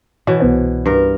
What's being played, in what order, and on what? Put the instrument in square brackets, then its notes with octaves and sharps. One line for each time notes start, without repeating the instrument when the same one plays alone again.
[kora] B2 E3 [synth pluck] C#5
[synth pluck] C2 B3 C5
[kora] G2 A#4